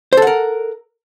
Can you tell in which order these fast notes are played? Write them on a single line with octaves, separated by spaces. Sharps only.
C5 A4 F#5 A#4